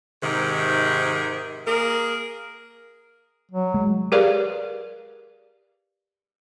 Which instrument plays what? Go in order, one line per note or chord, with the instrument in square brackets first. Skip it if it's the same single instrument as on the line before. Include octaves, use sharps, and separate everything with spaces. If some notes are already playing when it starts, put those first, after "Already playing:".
[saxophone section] G#2 C3 D#3
A#3 G#4 A#4
[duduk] F#3
[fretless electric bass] G#3
[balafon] G4 G#4 A#4 B4 D5 F5